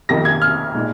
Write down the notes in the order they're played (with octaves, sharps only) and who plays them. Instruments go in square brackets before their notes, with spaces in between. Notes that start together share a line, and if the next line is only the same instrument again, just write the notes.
[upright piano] F2 C3 D#3 A#3 D#4 A#6
G#6
F6
A#2 G#3 D#4